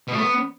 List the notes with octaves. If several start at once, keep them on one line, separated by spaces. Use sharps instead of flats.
B2
A3
B3